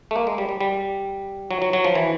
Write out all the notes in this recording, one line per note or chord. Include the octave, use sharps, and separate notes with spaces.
A3
A#3
G#3
G3
G3
G3
F#3
F#3
F#3
F3
E3